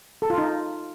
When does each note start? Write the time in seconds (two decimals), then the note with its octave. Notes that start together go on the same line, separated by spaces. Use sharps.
0.22 A4
0.30 F4
0.38 D#4